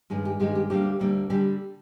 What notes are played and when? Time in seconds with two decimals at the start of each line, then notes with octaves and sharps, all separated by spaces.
0.10 G2 D#3 G#3 G#4
0.25 G4
0.40 G2 D#3 G#3 G4
0.55 G4
0.70 D2 D3 G3 A#3 G4
0.99 D2 D3 G3 A#3
1.30 D3 G3 G4